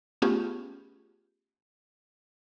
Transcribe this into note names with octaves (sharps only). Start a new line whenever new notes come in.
A3 B3 C#4 F4 G4 G#4